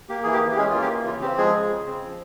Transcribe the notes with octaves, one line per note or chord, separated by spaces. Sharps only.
A#3 G4
E3 G#4
G4
E3
G4
G#3 C#4 G#4
A#3 F4
G4
E3
C#3 F4
C4 G4
F3 G#3 G#4
C#3
C#3
C4
F3